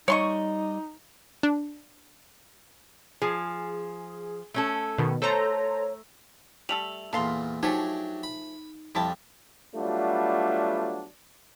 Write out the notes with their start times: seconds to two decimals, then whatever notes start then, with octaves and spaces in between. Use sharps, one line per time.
0.08 G3 D#4 C#5 D#5 C6 C#6
1.43 D4
3.22 F3 G#4
4.54 A3 C#4 A4
4.98 B2 D#3
5.22 A3 A4 C5 C#5 A#5
6.69 G3 A3 A4 F7 F#7
7.13 E2 A#2 A4 F5 C6
7.63 F3 F#3 A3 D4 D#4 G4 G#4
8.23 B5
8.95 F2 G3 E4 A5
9.75 F#3 G3 A3 B3 D4 F4